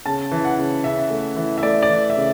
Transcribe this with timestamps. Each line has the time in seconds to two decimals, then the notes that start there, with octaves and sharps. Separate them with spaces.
0.06 C#3 A5
0.31 E3
0.45 F#5
0.58 C#3
0.84 C#3 E5
1.10 A3
1.36 E3
1.58 E5
1.63 A3 D5
1.83 D5
1.89 E3
2.10 E5
2.16 C#3